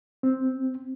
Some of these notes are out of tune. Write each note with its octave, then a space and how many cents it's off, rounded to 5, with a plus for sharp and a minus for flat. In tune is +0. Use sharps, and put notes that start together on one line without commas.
C4 +0